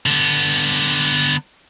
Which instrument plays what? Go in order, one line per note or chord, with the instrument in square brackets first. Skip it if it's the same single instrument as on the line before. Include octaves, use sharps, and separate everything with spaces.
[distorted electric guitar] D3 B3